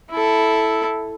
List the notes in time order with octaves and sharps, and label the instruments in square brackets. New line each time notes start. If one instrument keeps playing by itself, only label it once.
[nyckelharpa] E4 A4